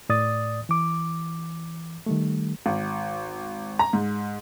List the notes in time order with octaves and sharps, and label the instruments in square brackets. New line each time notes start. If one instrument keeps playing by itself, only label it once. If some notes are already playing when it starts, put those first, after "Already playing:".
[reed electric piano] A2 D5 D#6 A6
E3 D6
D#3 G3 A3
[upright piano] G#1
A#5
G#2